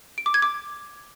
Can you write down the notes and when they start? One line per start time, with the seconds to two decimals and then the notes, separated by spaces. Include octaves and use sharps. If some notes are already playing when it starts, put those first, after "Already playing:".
0.18 D7
0.26 D6
0.34 G#6
0.42 D6